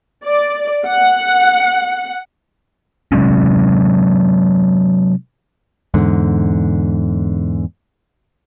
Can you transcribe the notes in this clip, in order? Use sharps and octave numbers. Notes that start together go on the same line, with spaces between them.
D5
F#5
C3 F#3 G#3 C#4
E2 G#2 D3